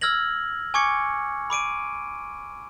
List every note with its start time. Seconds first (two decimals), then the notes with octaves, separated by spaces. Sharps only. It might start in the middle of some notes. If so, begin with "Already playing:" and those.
0.01 E6 F6 G#6 A#6 F#7
0.74 G#5 C#6 D6 G#6 C#7
1.50 B5 D6 D7 D#7